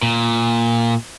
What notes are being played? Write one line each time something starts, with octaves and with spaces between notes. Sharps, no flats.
A#2